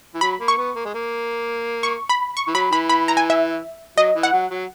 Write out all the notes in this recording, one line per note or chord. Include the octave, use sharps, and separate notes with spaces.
E3
F#3 B5
A#3
C#6
B3
A#3
G#3
A#3
C#6
B5
C#6
E3
F#3 B5
E3 B5
B5
A#5
G#5
E5
F#3 D#5
E3
F#5
F#3
F#3